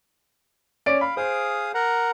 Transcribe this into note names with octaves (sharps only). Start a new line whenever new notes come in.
C#4 D5 D7
F5 B5
G#4 C5 F5 D#6
A#4 F#5 A#5